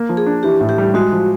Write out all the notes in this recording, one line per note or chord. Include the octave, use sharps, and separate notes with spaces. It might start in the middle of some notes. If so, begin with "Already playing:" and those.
Already playing: A#3
F3
G#4
D4
E3 G4
A2
G4
G3
G#3 F#4
F3